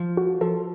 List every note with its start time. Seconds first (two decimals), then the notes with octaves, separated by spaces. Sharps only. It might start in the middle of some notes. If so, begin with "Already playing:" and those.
Already playing: F3
0.17 F#4
0.41 F3 A4